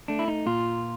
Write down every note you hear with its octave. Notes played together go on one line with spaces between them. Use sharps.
A3 D4
E4
D#4
A#2 F4